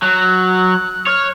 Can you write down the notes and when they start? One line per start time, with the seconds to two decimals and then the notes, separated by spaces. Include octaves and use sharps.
0.02 F#3 F#6
1.07 C#5 F6